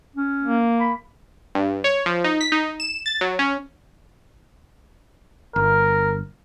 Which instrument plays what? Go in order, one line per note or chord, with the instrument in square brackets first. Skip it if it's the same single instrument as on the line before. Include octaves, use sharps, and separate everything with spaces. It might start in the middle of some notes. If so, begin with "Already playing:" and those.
[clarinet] C#4
[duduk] A#3
[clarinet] B5
[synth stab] G2
C#5
F3
D#4
B6
D#4
E7
A6
F#3
C#4
[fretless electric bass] G1 [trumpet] A#4